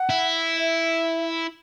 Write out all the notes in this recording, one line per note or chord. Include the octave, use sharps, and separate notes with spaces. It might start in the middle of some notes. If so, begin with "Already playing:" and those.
Already playing: F#5
E4
E5